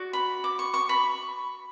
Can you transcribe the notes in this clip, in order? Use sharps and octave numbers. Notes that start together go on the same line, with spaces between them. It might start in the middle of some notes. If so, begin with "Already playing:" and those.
Already playing: F#4 D5
B5
D6
C#6
C#6
B5